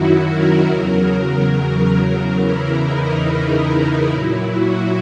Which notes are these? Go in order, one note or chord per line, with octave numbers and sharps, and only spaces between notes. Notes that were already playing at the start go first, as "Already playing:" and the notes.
Already playing: F#2 D#3 F#3 E4 F#4
A#4
E2 C#3 F#3
E2 C#3 E3 E4
D#4
E4
A#2 F#3 E4
F#4